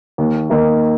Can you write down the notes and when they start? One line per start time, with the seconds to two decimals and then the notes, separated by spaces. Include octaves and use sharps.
0.18 D#2
0.50 D#3 A#3 D#4